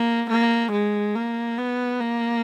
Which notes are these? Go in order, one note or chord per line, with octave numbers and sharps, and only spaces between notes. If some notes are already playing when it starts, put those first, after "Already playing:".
Already playing: A#3
A#3
G#3
A#3
B3
A#3